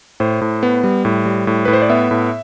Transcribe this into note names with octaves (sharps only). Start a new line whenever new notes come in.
A2 C5
A2
B3
G3
A2
G3
A2
A2 B4
C5
D5
B3 E5
A2